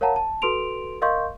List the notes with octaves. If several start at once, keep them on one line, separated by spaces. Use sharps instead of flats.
A#4 C#5 F5 F#5 A5 A#5
A5
F#4 A4 B4 C6 D7 F7
A#4 D#5 F5 C6 C#6 G6